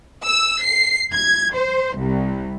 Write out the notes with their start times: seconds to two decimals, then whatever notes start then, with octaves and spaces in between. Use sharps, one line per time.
0.25 E6
0.63 C7
1.13 G#6
1.55 C5
1.97 C2